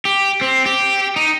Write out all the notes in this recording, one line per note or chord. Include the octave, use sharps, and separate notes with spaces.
G4
C4
G4
D#4